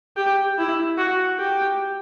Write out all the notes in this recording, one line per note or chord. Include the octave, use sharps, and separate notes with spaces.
G4
E4
F#4
G4